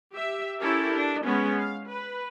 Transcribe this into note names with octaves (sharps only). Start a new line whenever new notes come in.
G4 E5
C#4 E4 G4 A4 A#4
D4
G#3 B3 C#4
F5
B4